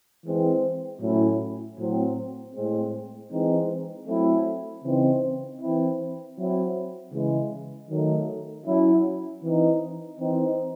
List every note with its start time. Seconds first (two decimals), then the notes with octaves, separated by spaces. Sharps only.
0.25 E3 G#3 C4
1.01 A2 F#3 C#4 E4
1.78 A2 F#3 C4
2.55 A2 G#3 C4
3.31 E3 G#3 C4 D#4
4.07 F#3 A3 C4 E4
4.83 C#3 E3 C4 D#4
5.61 E3 C4 E4
6.37 F#3 C4 E4
7.12 C#3 E3 G#3
7.89 D#3 F#3 A3 D#4
8.66 F#3 C#4 E4
9.42 E3 C4 D#4
10.18 E3 C4 D#4